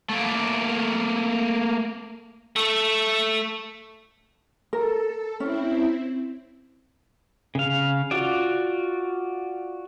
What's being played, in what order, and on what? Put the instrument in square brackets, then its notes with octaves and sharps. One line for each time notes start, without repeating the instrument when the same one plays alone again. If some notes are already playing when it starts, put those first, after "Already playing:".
[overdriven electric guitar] A3 A#3
A3 A4
[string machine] A4 [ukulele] A#4
[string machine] C4 E4 [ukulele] C#4
[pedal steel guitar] C#3 F5
F4 F#4 D5